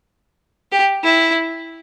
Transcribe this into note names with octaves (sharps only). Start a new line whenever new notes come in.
G4
E4